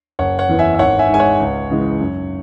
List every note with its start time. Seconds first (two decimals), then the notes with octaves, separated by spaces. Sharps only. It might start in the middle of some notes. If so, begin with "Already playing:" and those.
0.19 F#1 C#5 F#5
0.39 C#5 F#5
0.49 E2 E3 B3
0.59 E5 G#5
0.74 E5
0.79 G#1 C#5 F#5
0.99 E5 G#5
1.09 G#2 G#3 G#5
1.19 C#5 F#5
1.40 C#2
1.70 C#3 E3 G#3
2.00 F#2